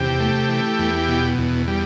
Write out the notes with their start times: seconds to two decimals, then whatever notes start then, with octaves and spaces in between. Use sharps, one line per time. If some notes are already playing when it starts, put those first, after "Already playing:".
Already playing: E2 C3 G4
0.20 A3
0.49 E3
0.79 E2
1.08 B2
1.38 E2
1.68 G3